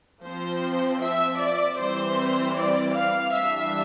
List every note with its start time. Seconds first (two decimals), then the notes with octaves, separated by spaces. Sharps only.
0.23 F3 C4 C5
1.01 E5
1.39 D5
1.79 E3 G3 C4 C5
2.57 D5
2.96 F5
3.34 E3 G3 D4 E5